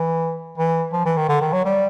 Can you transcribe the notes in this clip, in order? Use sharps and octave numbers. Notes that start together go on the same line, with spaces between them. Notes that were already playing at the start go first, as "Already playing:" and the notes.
Already playing: E3
E3
F3
E3
D#3
D3
D#3
F#3
G3